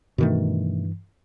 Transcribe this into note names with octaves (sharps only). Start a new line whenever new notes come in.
G2 B2 D#3 E3 A3